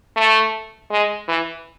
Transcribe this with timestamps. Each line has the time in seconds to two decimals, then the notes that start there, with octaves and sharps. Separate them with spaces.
0.17 A3
0.91 G#3
1.28 E3